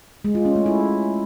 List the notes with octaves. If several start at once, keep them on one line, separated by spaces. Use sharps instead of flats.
G#3
F4
C#4
A3
E4